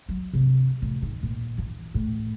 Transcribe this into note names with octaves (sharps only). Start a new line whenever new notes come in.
F#3
C3
A1
D#3
A#2
E3
A2